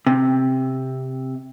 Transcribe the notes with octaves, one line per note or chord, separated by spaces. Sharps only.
C3